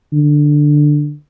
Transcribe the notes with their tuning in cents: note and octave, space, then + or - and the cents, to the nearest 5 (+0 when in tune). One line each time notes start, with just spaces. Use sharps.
D3 +10